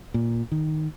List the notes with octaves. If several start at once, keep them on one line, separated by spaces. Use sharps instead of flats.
A#2
D#3